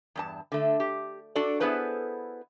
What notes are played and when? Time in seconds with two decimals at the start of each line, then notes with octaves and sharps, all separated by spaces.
0.15 E2 G2 A5
0.52 D3 A3
0.80 G4
1.35 D4 F#4 A4 D5
1.60 B3 E4 G#4 A4 B4 C5